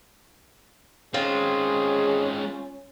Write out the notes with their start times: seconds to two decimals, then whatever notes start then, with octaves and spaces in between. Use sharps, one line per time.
1.14 G#3 C4 C#4 F4 G#4